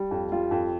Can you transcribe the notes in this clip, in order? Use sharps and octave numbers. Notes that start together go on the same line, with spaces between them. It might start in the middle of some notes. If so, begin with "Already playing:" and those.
Already playing: G3
F2
G3 F4
F2